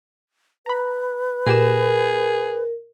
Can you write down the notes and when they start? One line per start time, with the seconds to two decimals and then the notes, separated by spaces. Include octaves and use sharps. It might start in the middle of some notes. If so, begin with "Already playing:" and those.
0.66 B4 A#5 B5
1.47 A#2 G4 G#4 A#4 E7